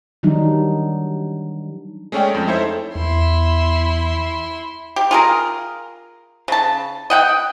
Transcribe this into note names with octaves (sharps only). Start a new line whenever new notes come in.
D#3 E3 F#3 G3 D4 D#4
G#3 A3 C#4 C#5 D5 G5
F2 G6
D#4 E4 A4 C5 C#5 E5
E2 E4 C6
G4
F4 G#4 A#4
C#3 A5
D#5 F#5 G5